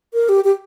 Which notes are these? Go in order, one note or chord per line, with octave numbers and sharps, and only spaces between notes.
A#4
G4
G4